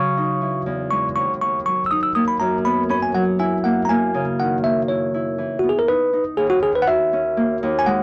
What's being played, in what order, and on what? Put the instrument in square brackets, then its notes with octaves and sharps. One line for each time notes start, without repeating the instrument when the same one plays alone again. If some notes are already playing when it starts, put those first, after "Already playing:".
Already playing: [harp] C#3 F#3 [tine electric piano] C#6
[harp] D#4
E3
E2
[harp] G#3 [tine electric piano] C#6
[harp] D#2 [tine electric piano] C#6
[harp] D#2 [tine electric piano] C#6
[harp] F#3 [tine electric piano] C#6
[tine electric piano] E6
[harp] D#4 [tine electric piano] D#6
[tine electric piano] E6
[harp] A#3 [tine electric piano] D#6
[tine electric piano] B5
[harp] F#2 [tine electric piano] A#5
[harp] B3 [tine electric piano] B5
[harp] C#4 [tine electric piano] B5
[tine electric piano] G#5
[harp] F#3 [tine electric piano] F#5
[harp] E4 [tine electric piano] G#5
[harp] A#3 [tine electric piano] F#5
[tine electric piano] A#5
[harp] A#3 [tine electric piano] G#5
[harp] C#3
[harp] D#3 [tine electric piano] F#5
[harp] A#3 [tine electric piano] E5
[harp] E4 [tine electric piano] C#5
[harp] E4
E3
[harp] B3 [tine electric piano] F#4
[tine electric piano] G#4
A#4
[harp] D#4 [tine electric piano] B4
[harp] D#4
[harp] D#2 [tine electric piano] G#4
[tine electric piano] F#4
[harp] D#3 [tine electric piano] G#4
[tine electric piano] B4
F#5
[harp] F#4 [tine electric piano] E5
[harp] C#4
A#3
D#2
[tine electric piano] G#5
[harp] G#3 [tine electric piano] F#5